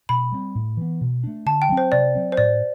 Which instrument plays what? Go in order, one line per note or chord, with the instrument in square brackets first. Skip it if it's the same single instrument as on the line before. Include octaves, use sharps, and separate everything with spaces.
[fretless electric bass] B2 [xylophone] B5
[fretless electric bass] G3 C4
A2
E3 B3
B2
A3 D4
[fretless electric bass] D3 [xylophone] A5
[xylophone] G5
[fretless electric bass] F#3 A3 C4
[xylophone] C5
[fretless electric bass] C3 [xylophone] D5
[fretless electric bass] F#3 C4
[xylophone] C5
[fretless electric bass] A2 [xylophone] D5